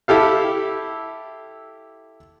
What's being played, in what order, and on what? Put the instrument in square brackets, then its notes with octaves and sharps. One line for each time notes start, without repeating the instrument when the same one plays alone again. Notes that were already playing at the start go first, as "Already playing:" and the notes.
[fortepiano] E4 G4 A4 F5